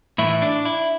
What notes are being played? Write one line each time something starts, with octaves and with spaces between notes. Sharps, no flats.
A2 E3 A3 E4
D4
E4